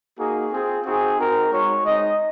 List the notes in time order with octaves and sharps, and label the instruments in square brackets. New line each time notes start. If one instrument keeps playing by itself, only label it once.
[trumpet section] A#3 D#4 F#4 G#4
C4 F4 G#4
C4 D#4 F#4 G#4
C4 D#4 F#4 A#4
G#3 D#4 F#4 C#5
G#3 C4 D#4 D#5